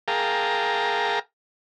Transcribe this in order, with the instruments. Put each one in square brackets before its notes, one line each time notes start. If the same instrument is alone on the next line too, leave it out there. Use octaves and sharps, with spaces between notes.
[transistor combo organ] G#4 A#4 F5 G5 A5 A#5